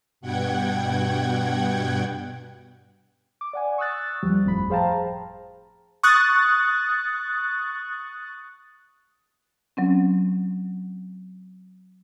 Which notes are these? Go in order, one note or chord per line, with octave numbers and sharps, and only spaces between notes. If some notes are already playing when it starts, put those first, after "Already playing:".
G2 B2 F#5 G5 G#6
D6
D5 F#5 G#5
C#6 D#6 E6 F#6 A6
D#2 F3 G3
G1 F2 A2 F3 B5
G#4 C5 F5 G5 A5 A#5
C#6 D#6 F#6 A6
F#3 C4 C#4